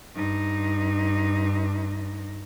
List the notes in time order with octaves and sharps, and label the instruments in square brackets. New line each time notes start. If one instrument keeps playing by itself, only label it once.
[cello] G2 D#4